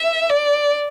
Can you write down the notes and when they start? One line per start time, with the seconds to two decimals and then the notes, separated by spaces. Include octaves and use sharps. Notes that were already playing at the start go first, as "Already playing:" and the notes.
Already playing: E5
0.30 D5